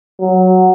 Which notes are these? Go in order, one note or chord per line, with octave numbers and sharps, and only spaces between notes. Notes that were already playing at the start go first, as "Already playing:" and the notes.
F#3